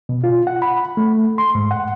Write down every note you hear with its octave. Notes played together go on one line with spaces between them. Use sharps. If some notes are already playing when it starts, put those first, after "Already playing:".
B2
F4
F#5
B5
A3
C6
G#2
F#5